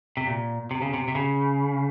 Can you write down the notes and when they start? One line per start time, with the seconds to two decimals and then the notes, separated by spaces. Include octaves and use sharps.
0.17 C3
0.27 A#2
0.71 C3
0.82 C#3
0.94 C3
1.08 C3
1.15 C#3